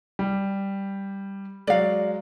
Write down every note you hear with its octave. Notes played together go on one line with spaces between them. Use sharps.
G3
F#3 G#3 D5 F5